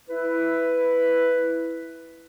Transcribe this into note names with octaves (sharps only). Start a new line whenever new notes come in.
E4 B4